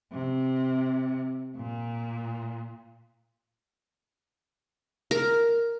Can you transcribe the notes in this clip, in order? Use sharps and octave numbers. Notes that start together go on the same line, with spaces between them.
C3
A#2
A#4